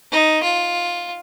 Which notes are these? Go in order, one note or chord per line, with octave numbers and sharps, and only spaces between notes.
D#4
F4